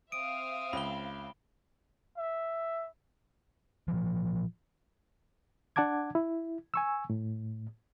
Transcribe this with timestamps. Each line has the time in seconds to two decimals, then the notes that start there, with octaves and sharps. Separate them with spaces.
0.12 C4 E5 F5 D#6 D7
0.73 C#2 B5 G7
2.17 E5
3.88 A#2 C#3 E3 F3
5.76 D4 F#5 A5 D6 G#6
6.15 E4
6.74 G#5 C#6 E6
7.10 A2